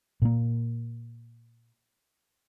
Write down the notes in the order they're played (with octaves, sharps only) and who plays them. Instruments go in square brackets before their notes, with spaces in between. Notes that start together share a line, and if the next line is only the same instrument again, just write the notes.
[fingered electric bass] A#2 A#3